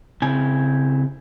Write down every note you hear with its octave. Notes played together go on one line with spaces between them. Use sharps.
C#3 C4 E4 G#5